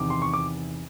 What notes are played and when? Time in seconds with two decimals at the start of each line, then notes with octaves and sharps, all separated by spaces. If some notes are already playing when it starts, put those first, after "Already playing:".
Already playing: E2 C3 D#3 D6
0.10 C6
0.22 C#6
0.34 D6